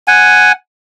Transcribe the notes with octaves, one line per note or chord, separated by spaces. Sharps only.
F#5 G#5